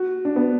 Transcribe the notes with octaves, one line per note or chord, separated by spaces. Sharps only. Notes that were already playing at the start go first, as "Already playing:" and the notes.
Already playing: F#4
D4
B3